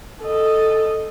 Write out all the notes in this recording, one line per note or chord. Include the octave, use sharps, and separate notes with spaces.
A4 D#5